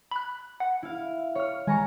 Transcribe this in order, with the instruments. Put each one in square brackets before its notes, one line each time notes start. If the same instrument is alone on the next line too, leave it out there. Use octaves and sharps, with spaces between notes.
[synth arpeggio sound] B5 F#6
F#5
[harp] E4 F5
C#5 F6
[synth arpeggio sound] D#3 G#3 [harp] G#5 A#5 C#6